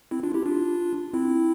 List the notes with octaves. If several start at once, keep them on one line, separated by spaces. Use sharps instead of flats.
C4 E4
D4 F4
E4 G4
D4 F4
C4 E4